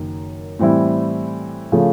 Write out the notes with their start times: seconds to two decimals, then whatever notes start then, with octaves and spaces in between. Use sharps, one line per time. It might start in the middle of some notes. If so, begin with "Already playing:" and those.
Already playing: F#1 F#2 D#3
0.59 A2 E3 G3 C4 E4
1.72 C#3 F3 A3